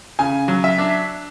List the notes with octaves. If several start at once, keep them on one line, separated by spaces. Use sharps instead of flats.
C#3 G#5
F#3
E5
D4